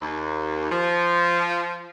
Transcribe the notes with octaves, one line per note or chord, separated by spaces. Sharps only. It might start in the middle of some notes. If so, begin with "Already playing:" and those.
D#2
F3